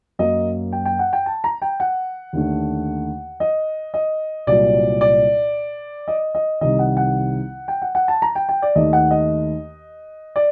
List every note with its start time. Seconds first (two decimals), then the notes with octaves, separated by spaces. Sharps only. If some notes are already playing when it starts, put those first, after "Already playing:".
0.19 F#2 F#3 A#3 D#5
0.72 G5
0.85 G5
0.99 F#5
1.13 G5
1.26 A5
1.44 A#5
1.62 G5
1.80 F#5
2.33 D#2 D3 A3
3.40 D#5
3.94 D#5
4.47 C2 A#2 F#3 D5
5.01 D5
6.08 D#5
6.35 D#5
6.61 C2 C3 D#3 D#5
6.79 F#5
6.97 F#5
7.68 G5
7.82 F#5
7.95 F#5
8.08 A5
8.22 A#5
8.35 G5
8.49 G5
8.62 D5
8.75 D#2 D#3 A3 D#5
8.93 F#5
9.11 D#5
10.36 D5